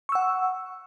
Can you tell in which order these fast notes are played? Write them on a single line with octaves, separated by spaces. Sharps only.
C#6 E6 F#5